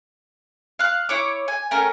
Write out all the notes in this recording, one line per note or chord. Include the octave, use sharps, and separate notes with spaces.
F5 F#6
E4 C#5 D6
G#5
A3 C#4 A#4 G5